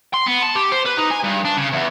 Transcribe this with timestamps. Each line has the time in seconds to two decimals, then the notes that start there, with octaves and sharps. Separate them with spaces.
0.14 C6
0.26 B3
0.43 A5
0.55 G4
0.72 C5
0.85 B4
0.97 D#4
1.10 G#5
1.23 G2
1.45 D4
1.57 C#3
1.73 E2